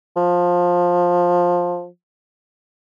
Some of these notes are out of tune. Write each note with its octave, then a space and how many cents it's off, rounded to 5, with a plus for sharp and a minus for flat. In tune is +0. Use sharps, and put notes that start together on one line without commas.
F3 +15